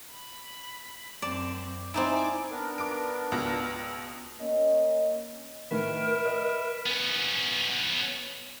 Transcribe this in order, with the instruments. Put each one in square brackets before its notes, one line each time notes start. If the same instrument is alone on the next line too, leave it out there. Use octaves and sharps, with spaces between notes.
[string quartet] B5
[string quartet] F#2 C4 [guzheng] D5 A5
[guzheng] C4 D#4 E4 [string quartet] D5 G#5 D6
[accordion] B3 D4 A#4
[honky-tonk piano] D6 D7
C#2 B2 A#6
[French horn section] A#3 C#4 C#5 D#5
[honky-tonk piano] A2 D#3 [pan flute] A#4 [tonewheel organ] B4 E5
[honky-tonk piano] D#5
[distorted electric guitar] B3 C#4